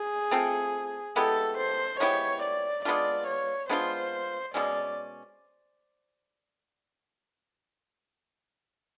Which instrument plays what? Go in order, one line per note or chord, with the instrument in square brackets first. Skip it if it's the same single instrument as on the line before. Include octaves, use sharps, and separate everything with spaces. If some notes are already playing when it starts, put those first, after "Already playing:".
Already playing: [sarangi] G#4
[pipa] A3 C4 F4 A4
[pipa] G#3 B3 E4 G4 [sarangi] A4
[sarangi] C5
[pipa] G#3 B3 E4 G4 [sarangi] C#5
[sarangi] D5
[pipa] G#3 B3 D4 F4 [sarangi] D5
[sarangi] C#5
[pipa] G#3 B3 D4 F4 [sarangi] C5
[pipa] B2 G#3 C#4 [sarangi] D5